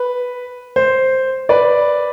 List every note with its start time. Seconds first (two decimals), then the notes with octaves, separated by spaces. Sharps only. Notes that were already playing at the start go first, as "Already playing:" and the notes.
Already playing: B4
0.76 C5
1.49 B4 D5